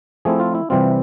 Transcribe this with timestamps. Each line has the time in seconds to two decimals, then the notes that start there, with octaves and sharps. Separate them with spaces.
0.25 F3 A3 C4 E4 G#4
0.40 F4
0.55 E4
0.70 C3 E3 G3 C4 F4